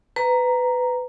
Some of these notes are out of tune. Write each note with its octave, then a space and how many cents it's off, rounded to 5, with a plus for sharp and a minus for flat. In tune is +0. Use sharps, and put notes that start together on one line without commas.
B4 +20 A#5 +0